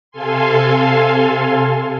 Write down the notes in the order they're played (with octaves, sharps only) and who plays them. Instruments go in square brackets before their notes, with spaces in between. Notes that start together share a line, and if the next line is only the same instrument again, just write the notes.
[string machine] C3 A4 F5 G#5 C6